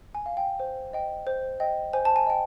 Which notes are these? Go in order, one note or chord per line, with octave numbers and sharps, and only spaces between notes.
G#5
F5
G5
C5
D#5 G5
C5
D#5 G5
C5 G#5
A5
G#5
D#5 G5